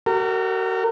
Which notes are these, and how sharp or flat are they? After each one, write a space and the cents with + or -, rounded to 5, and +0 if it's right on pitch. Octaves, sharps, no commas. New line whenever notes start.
F#4 +35 A#4 -30